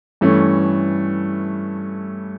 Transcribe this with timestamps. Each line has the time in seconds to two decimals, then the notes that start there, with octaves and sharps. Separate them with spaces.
0.21 G2 E3 A3 C#4